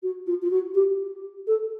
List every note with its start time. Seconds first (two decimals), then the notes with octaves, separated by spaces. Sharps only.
0.03 F#4
0.26 F4
0.42 F4
0.51 F#4
0.74 G4
1.47 A4